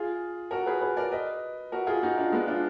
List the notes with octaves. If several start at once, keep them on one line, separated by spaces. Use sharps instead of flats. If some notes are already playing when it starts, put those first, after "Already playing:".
Already playing: F4 G#4
F#4 A#4
G#4 B4
G#4 B4
A#4 D5
B4 D#5
F#4 A#4
F4 G#4
D#4 F#4
D4 F4
G#3 B3
D4 F4